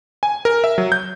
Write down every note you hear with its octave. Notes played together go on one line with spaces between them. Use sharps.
G#5
A#4
E5
F#3
G6